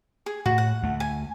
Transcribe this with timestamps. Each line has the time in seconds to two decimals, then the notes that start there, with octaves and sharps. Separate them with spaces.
0.26 G#4
0.46 A2 F#4
0.58 F#5
0.83 D2 A3
1.00 G#5